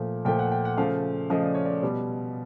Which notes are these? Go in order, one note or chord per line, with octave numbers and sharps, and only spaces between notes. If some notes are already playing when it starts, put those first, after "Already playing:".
Already playing: A#2 F3 A3
A#2 F3 A3 G5
F#5
G5
F#5
C#3 F3 A3 F5
C#3 F3 A3 D#5
D5
C#5
D5
B2 G3